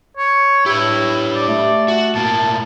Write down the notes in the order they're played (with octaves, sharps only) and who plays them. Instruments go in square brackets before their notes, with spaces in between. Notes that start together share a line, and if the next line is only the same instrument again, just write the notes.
[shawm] C#5
[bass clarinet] A2 [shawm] E4 [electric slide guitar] G4 B4
[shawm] D5
[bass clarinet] A3
[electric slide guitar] F#4
[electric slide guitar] A2 A#3 [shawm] A5